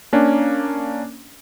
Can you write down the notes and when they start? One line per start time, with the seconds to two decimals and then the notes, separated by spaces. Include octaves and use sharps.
0.13 A#3 C#4 D4